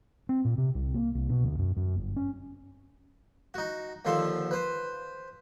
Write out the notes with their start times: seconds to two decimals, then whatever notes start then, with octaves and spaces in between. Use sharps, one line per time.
0.29 C4
0.45 A#2
0.58 C3
0.75 C2
0.94 A#3
1.15 C2
1.29 B2
1.44 D2
1.59 F#2
1.77 F#2
1.96 G1
2.16 C#4
3.54 D#4 F#4
4.05 D#2 D3 F3 A4 C6
4.51 B4 C5